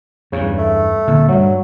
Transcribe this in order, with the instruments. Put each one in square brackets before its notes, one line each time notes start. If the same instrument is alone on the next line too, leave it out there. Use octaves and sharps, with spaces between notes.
[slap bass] E2 G2 [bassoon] C#3
[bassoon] A3
[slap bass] D2 A#2 D3
[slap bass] G2 G3 [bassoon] F#3